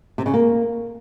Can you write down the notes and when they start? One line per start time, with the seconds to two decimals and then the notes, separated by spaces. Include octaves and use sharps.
0.18 C3
0.26 C#3
0.34 A#3